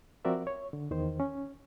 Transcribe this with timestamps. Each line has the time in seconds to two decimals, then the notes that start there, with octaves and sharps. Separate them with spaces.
0.25 F3 C4 F#4 A#4 D5 E5
0.47 C#5
0.73 D3
0.91 E2 D#3 C5
1.20 C#4